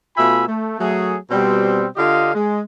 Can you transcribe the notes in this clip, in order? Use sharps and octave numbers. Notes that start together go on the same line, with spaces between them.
B2 A3 F4 E5 G#5 B5
A3
F#3 A3 G#4
B2 G3 C4
D3 D4 F4 G4 D#5 F5
G#3